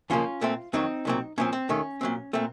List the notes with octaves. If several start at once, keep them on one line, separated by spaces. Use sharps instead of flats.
D#2 C#3 F3 A#3 C#4 F4
A#2 A3 C4
F2 D#3 F#3 C4 D#4
C2 A#2 F#3 C4
A#2 F3 C4 C#4
C4
D#2 D#3 A3 C#4
A#2 F#3 C4
A#2 A3 C4